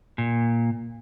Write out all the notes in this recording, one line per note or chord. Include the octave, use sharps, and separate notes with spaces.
A#2